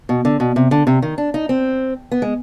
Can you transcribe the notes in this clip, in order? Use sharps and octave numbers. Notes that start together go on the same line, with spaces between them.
B2
D3
B2
C3
D3
C3
D#3
D4
D#4
C4
B3
G#3